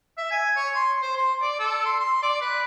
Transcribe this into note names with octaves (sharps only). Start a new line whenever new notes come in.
E5
G#5
C#5
C6
C5
C6
D5
A4
C6
C6
D5
B4